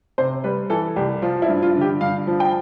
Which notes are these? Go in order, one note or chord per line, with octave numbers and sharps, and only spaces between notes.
C3 C5
G3 B4
E3 A4
C2 G4
F3 F4
E4
G2
F4
D3
G4
G2 F5
F3
G5